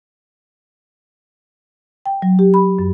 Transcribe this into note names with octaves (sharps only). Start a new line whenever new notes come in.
G5
F#3
G4
B5
F#2